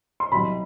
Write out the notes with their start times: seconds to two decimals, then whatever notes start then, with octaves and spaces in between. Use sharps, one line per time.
0.20 C6
0.32 C2 B2 F#3 B5